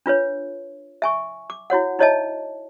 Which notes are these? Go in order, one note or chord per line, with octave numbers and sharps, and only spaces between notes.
D4 F4 B4 C#5
E5 G#5 C#6
D6
E4 F#4 C#5 F#5
D#4 E4 C#5 D#5 E5 A5